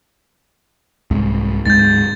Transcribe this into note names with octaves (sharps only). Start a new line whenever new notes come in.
C2 G#2
D1 G#2 G#3 G6 A6